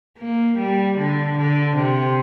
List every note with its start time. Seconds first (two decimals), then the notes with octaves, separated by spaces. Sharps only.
0.19 A#3
0.58 G3
0.98 D3
1.37 D3
1.76 C3